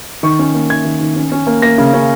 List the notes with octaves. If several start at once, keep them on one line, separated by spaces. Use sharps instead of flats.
D#3 C#6
C#4
A#3
D#3 G#6
D#3
D#3
C#4
C#4
A#3
A#3 A#6
C#3
C#4